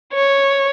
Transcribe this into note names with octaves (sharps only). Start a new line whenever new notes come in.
C#5